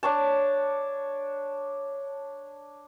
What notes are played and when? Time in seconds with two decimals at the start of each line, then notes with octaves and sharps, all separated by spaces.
0.03 D4 C#5 A5